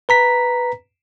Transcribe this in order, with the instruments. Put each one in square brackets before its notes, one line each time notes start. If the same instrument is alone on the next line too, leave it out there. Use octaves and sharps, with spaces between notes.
[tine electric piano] B4 A#5 B6